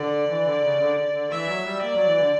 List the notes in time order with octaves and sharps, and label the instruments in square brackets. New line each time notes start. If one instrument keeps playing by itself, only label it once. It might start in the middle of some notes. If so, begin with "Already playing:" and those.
Already playing: [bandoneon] D3 [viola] D5
[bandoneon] E3
D3
C#3
D3
D3
[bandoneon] E3 [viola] E5
[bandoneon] F#3
G3
[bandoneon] A#3 [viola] D5
[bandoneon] F#3
E3
D3